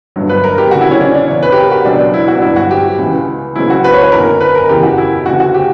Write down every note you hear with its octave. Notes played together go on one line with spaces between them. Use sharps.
G1 G2 F#3
B4
A#4
G4
D2 C#3 F#3 F#4
E4
C#4
D4
D4
E2 C#3 E3 C#5
B4
G4
A#4
F#4
C#2 B2 F#3 D4
D4
E4
F#4
D4
G1 G2 F#3 E4
F#4
G4
C#2 C#3 E3
C#2 C#3 F#3 E4
F#4
B4
C#5
B4
F#1 E2 D3 A#4
B4
A#4
F#1 E2 C#3 E3 G4
F#4
E4
D2 C#3 E3 F#4
F#4
G4